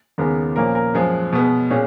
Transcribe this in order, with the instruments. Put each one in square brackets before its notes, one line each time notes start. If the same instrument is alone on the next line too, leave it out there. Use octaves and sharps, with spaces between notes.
[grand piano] D#2 C#3 G#3 B3 A#4
A#2 F3 A#3 C#4 A#4
A#4
F#2 F3 G#3 G#4
B2 G#3 B3
A#2 G#3 C#4